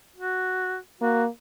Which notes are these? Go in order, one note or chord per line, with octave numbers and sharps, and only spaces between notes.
F#4
A#3 F#4